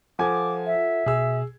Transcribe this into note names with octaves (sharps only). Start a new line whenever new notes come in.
F3 F4 A4 F#5 G#5 D6 G#6
E5
B2 G#4 E6